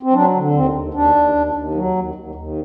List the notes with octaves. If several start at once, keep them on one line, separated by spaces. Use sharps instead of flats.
C4
F#3 D4
D3
D#2 C4
D#2
D#2 D4
D#2
D#2
D#2
F#3
D#2
D#2
D#2